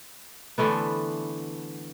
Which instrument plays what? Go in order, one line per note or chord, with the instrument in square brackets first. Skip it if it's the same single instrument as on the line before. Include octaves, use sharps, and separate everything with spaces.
[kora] D3 E3 A3 B3